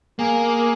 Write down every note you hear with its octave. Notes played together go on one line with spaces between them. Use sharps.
A#3 G#4